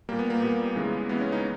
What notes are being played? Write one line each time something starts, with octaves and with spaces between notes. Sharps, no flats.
A#2 G3 A#3
B3
A#3
A#2 G3 B3
C#3 E3 G#3
C#3 E3 G#3 B3
C#4
D#4